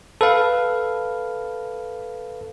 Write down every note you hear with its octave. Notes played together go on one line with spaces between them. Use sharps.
A4 B4 F5